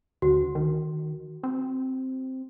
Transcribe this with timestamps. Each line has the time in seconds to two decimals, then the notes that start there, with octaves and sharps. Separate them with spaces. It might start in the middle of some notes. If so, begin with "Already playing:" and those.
0.22 D2 F#4
0.55 D#3
1.43 C4